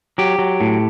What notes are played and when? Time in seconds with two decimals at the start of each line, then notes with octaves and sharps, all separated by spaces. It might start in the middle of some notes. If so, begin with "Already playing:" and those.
0.18 F#3 G4
0.39 F#3
0.61 A2